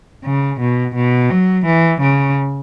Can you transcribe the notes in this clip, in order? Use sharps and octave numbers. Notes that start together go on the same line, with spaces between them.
C#3
B2
B2
F#3
E3
C#3